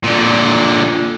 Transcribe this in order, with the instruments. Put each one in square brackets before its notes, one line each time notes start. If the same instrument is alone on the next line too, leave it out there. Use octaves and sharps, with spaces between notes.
[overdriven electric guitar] A#2 D3